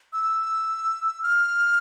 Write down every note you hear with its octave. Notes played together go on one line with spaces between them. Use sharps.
E6
F6